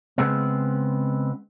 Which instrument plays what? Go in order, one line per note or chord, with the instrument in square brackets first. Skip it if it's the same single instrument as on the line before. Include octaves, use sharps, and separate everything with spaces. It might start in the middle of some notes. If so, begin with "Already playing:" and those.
[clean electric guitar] C#3 G#3 B3 C4